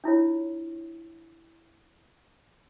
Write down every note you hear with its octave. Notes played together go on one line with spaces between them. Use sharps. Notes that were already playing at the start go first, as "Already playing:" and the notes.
D4 E4 F4 C#5